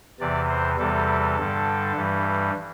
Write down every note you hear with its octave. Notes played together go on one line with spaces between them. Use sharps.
E2 C3 E3 D5
C5
E2 C3 E3 G3 A4
G2 D3 G3
G2 E3 G3